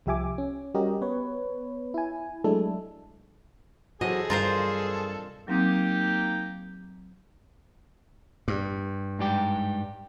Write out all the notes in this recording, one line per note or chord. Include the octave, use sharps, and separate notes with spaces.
C2 F3 G4 E5 G#5 D6
C#4
G3 C#4 F#4 G4 A#4 D#5
B3 B4 C#5
E4 G#5
F#3 G#3 A3 D4 E4 A4
C3 E3 F#3 F#4 G#4 A4 D#5
G2 F4 A#4 C5
F#3 A#3 C4 D#4 G4 D#6
G2
G#2 G3 G4